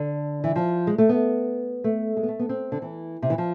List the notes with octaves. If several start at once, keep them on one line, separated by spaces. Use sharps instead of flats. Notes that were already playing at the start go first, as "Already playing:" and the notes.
Already playing: D3
E3
F3
G#3
A3
B3
A3
G#3
B3
A3
B3
C4
D3
E3
C3
E3
F3